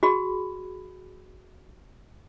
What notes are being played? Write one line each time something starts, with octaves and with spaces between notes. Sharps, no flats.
F#4 G#4 B5